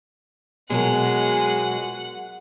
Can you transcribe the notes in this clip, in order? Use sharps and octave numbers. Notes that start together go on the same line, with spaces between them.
B2 F#3 G#3 A#4 F#5